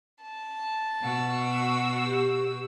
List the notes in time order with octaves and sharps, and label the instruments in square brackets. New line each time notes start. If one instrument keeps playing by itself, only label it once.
[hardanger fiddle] A5
[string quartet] B2 F#4 E6
[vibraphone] G4